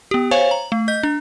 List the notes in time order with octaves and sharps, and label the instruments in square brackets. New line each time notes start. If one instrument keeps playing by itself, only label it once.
[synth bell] B3 G4
C5 C#5 F5 G#5 C#6
A#5
A3
D#5 G6
D4